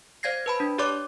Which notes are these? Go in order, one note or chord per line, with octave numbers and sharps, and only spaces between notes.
C5 D5 F5 G#6 A#6 C7
B4 A5 B5
D4
G4 C#5 D5 C6 D6